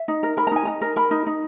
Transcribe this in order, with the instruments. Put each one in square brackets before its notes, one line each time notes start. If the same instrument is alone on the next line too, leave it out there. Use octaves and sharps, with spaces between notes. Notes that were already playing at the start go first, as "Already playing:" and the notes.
Already playing: [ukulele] E5
D#4
A#4
A#4 B5
A#5
D#4 G#5
D#4 A#5
A#4
A#4 B5
D#4
D#4